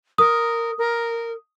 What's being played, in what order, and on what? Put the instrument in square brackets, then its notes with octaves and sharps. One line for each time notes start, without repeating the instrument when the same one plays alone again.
[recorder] A#4 [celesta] D#6
[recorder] A#4